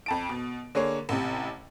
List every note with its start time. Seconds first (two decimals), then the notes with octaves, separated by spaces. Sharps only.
0.06 F2 A5 D7
0.29 B2
0.75 D3 A#3 G#4 C#5
1.09 A1 C3